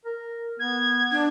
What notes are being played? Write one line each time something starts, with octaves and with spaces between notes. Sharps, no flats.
A#4
B3 G#6
D4